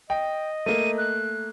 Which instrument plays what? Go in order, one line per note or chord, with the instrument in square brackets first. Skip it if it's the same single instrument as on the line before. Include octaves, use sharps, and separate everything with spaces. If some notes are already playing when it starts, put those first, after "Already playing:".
[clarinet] D#5 [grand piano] G5
[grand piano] A3 A#3 [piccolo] D#7
[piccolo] F#6